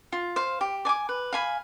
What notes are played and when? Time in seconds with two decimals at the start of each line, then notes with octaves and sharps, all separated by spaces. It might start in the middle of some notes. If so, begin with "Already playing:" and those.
0.12 F4
0.36 C5 F5
0.61 G4
0.85 D5 G#5 D6
1.09 B4
1.33 F5 G#5 B5